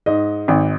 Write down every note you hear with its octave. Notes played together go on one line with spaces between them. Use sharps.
G#2 D#5
G#1